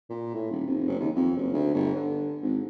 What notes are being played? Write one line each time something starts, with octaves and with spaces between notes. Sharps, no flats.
A#2
A2
D#1
F1
F#1
D#2
F2
F#1
D2
G1
D3
G#1